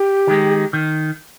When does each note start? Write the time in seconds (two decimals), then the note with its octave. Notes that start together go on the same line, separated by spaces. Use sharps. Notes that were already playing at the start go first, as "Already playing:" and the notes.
Already playing: G4
0.27 D#3 G#3
0.73 D#3